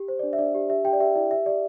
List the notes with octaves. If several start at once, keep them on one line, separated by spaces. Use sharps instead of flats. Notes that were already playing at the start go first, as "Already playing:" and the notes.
Already playing: G4
C5
D4 D5
E5
D4 D5
G4
G4 E5
G4 G5
D5
G4 E5
E4 D5
G4 E5
G4 D5